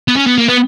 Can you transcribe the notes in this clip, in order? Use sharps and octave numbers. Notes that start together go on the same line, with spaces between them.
B3
C#4
B3
A#3
B3